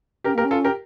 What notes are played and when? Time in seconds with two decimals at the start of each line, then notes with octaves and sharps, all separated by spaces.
0.24 C#4 G4 A#4
0.34 A#3 G4 A#4
0.44 C#4
0.51 F4 A4
0.65 G4 A#4